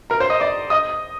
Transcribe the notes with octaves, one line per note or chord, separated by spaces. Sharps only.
A#4 A#5
C5 C6
D#5 D#6
D5 D6
D#5 D#6